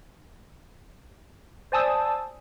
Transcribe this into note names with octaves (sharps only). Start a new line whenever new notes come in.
C5 D5 G#5 A5 D#6 E6